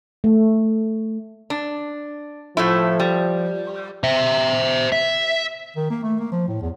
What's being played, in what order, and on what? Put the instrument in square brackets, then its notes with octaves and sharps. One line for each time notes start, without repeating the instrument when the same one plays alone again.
[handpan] A3
[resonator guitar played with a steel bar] D4
[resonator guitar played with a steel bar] A2 A3 E4 [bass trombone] F3
[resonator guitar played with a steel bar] G3
[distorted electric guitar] C5 E5
E5
[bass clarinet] D#3
A#3
A3
A#3
F3
A2
E2